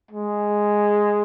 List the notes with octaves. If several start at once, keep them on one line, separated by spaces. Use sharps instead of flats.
G#3